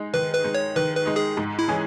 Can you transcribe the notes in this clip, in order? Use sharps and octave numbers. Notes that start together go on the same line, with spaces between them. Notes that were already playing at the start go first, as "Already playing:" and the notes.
Already playing: G#3 D#4
D#3 B4
B4
G#3 D#4
C#5
D#3 B4
B4
G#3 D#4
G#4
G#2
E4
E3 G#3 C#4 G#4